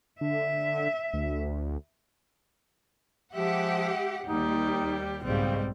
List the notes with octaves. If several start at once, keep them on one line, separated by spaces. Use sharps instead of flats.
D3 E5
D2
F3 G#3 G4 E5 F#5
D#2 G3 D#4 G4
B1 G#2 C#3 G3 C4